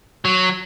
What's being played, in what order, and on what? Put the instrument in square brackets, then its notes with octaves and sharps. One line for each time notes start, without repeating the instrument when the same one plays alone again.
[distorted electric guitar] F#3